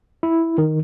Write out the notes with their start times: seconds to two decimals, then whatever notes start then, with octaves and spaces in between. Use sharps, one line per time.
0.23 E4
0.58 D#3